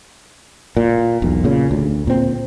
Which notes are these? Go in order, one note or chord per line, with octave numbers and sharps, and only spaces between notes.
A#2
E1 B1
A#2 C#3
D2
A#2 C4